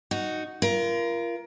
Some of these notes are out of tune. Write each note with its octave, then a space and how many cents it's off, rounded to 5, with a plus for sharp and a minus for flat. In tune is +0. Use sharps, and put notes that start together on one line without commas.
D#4 +0 F#4 +0
F4 -35 A#4 +20